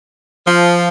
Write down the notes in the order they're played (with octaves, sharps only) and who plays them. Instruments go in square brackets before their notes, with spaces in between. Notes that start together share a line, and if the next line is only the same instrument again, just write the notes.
[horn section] F3